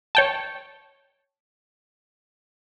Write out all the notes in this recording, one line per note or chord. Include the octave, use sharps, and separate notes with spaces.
C#5 G5 A5